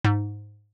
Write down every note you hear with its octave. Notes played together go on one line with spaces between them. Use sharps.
G#2